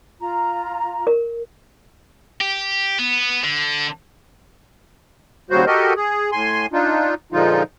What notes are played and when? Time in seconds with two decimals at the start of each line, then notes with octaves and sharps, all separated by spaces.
0.20 F4 A#5
1.07 A#4
2.41 G4
2.99 B3
3.44 D3
5.50 D#2 C#3 F#3 G3 F#4 C5
5.66 F#4 G4 A4 A#4 D#5
5.96 G#4
6.32 A2 G#5 C6
6.73 D4 D#4 F4
7.32 A#2 D3 F3 G#3 D#4 F4